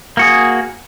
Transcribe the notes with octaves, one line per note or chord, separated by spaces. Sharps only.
A#3 F#4 G#4